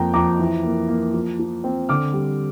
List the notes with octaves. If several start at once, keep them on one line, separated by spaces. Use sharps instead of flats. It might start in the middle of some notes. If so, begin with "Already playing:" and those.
Already playing: F2 A#3 G5 A#5
F2 A#5 D6
E3
A#3
A#3
F3
F3
C4
D3 D6 F6
G3